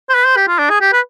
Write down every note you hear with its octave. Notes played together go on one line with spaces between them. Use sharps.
C5
B4
C5
G4
F4
D4
G#4
G4
B4